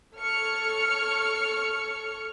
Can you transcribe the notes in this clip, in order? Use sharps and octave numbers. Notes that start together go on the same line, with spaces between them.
A4 C#5 C#6 F6 C#7